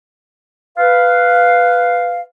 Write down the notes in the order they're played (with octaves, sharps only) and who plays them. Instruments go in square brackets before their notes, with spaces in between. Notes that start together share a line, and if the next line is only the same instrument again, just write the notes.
[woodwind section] B4 F5